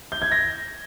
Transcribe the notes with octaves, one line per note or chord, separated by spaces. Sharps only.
G6
G#6
A#6